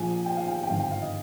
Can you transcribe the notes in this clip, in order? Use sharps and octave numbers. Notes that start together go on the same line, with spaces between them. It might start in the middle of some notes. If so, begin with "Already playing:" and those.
Already playing: A#1 A#2 F3 G#5
G5
F5
G5
G5
G#1 G2 D3 F5
G5
F5
D#5